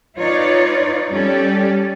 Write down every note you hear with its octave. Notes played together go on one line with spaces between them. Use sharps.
D#4 F4 B4 C#5 D5
G3 C#4 G4 A4 D5